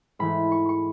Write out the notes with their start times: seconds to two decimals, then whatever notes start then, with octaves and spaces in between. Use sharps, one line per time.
0.19 G#2 E3 A3 B5
0.52 C#6
0.69 C#6